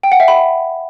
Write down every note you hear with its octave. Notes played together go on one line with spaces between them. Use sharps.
G5
F#5
E5
B5